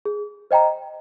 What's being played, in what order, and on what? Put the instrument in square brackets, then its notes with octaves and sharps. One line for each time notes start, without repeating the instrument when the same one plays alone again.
[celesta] G#4
C5 D#5 G5 A#5